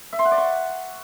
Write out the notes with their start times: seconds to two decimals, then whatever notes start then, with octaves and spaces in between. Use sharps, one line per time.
0.13 E5
0.19 C6
0.25 F#5
0.31 D5
0.38 C#6